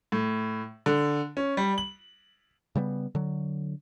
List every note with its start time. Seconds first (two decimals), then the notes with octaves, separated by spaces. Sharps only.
0.12 A2
0.86 D3
1.37 C#4
1.57 G3
1.78 F#7
2.76 C#3 G3 A#3 B3
3.15 D3 F#3